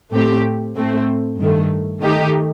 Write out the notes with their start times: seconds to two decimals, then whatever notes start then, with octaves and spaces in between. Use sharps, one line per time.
0.12 A2 A3 C4 G4
0.76 A2 A3 C4
1.39 G2 D#3 A3
2.02 D#3 A3 D#4 G4